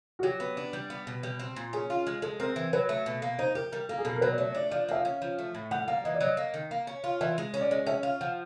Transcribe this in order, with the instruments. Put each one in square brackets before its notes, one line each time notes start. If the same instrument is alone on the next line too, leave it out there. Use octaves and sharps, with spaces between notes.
[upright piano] F#4
[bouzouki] F#3 [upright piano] G4
[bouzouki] B3
D4
G3
B3
B2
G3
C4
A#2
[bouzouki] C#4 [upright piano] G#4
[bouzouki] F4
G#3
[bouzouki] G#3 [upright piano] A4
[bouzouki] C4 [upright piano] A#4
[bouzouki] E3
[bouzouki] F#3 [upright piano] B4
[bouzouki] A3
B2
A#3
[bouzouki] D#4 [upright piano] C5
[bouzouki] G4 [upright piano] A#4
[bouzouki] G3 [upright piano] A#4
[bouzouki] A#3 [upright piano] A4
[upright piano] G#4
[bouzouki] B2 [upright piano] A4
[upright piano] A#4
[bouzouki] F#3 [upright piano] B4
[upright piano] D5
[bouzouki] A3 [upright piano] C#5
[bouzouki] D4 [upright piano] D5
[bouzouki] F3 [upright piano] D5
[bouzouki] A#3 [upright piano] E5
[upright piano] F5
[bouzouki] C#4
F3
A3
A2
[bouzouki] G3 [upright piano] F#5
[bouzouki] A#3 [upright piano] F5
[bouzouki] E3 [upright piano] D#5
[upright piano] D5
[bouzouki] F#3 [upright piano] D#5
[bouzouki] A#3
D#3
A#3
C#4
F4
[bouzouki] E3 [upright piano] E5
[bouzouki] G#3
C#4
[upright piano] D5
[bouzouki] G#3 [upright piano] D#5
[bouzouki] C#4 [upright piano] E5
[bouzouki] F4
[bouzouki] F3 [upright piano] F#5